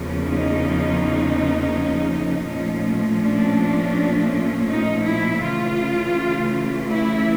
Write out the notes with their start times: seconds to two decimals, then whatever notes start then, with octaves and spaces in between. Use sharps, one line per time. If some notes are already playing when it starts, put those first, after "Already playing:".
Already playing: E2 C#3 F3 A#3 C#4
0.22 D#4
2.45 A#2 F3 A3 C#4
3.19 D4
4.67 D#4
5.04 E4
5.40 C#3 E3 A3 F4
6.89 E4